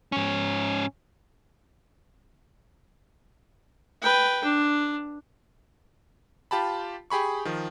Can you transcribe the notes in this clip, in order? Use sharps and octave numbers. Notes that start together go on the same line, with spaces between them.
G#2 C#4
B4 G5
D4
F4 G4 A5 B5
G4 G#4 B5 C#6
D#3 F3